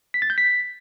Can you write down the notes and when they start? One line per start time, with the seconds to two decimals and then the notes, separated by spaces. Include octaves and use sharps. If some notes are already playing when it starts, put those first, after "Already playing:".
0.14 B6
0.22 A6
0.30 G6
0.38 B6